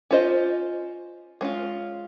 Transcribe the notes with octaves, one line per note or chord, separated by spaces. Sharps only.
C#4 F4 C5 D#5
G#3 C#4 F4